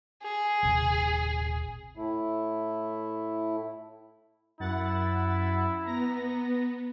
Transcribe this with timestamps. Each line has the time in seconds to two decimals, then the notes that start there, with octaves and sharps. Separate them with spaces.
0.23 G#4
0.63 D#1 G#1 C3
1.97 A2 A3 E4
4.60 F#2 E4 F#5 A6
5.84 B3 A#5 A#6